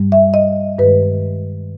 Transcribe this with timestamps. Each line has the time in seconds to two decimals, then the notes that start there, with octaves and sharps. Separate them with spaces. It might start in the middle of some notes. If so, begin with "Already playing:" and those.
Already playing: G2 G3
0.12 E5
0.34 D#5
0.79 G2 D#3 G#3 B4